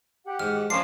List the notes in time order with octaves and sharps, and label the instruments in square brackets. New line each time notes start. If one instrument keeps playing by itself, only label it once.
[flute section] G4 F#5
[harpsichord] G#2 [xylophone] F6
[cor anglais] F3 [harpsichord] A#3 D4 [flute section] C#4 A#4 [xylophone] C7